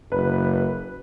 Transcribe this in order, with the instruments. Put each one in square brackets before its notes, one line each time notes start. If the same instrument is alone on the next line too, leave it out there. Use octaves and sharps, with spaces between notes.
[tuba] F#1 [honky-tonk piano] B4